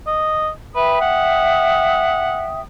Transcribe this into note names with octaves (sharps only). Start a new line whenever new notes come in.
D#5
B4 E5 G5 D#6
F#5